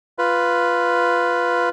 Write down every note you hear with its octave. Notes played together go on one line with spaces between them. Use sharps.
F4 B4